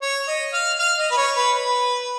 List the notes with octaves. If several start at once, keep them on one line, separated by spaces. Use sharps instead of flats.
C#5
D#5
F5
F5
D#5
B4
C#5
B4
B4